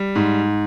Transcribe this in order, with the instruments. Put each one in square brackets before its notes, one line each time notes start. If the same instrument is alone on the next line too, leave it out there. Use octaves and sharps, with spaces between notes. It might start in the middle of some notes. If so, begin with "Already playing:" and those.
Already playing: [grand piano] G3
G#2